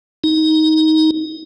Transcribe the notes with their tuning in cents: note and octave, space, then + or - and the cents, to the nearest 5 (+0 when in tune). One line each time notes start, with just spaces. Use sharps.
D#4 +15